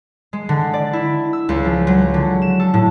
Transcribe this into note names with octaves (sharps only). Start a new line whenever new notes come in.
G#3
D3
D5
E4
E6
C#2
F3
F#3
D3
E7
A4
A2